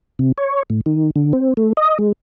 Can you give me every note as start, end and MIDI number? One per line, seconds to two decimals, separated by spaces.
0.19 0.32 48
0.38 0.63 73
0.70 0.81 45
0.86 1.11 51
1.16 1.33 50
1.33 1.54 60
1.57 1.73 57
1.77 1.98 75
1.99 2.12 56